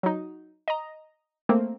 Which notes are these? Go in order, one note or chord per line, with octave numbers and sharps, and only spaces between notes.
F#3 D#4
D#5 A#5
A3 A#3 C4